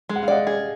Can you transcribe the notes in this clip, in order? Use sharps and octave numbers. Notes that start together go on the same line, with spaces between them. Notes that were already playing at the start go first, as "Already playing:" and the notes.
G#3
F#5
F5
D5 D#5 F#5
G#4